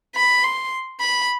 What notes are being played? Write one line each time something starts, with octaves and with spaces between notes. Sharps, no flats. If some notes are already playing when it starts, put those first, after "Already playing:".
B5
C6
B5